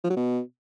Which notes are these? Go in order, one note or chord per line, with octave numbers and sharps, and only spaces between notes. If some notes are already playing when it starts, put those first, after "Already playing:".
F3
F#3
B2